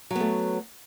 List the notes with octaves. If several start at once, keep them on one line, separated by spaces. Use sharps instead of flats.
F#3 A3 B3